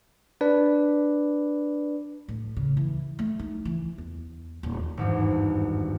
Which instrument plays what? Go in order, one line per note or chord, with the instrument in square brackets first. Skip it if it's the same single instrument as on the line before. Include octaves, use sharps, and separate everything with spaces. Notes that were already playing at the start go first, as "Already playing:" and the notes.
[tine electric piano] D4 B4 D5
[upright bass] A2
C#3
E3
A3
D#4
E3
E2
D#1
[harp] G#1 E2 G2